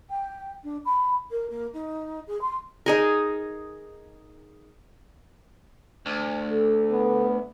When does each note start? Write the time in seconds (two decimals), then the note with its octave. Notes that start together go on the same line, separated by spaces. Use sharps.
0.10 G5
0.64 D4
0.85 B5
1.31 A#4
1.50 A#3
1.73 D#4
2.27 G#4
2.41 C6
2.86 D#4 G#4 A#4
6.06 D2
6.50 A4
6.92 B3